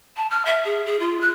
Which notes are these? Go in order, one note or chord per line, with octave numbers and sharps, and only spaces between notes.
A5
F6
E5
G#4
G#4
F4
F#6